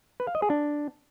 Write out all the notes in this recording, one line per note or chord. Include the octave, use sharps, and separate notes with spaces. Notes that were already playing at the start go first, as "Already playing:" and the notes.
B4
F5
D#5
G#4
D4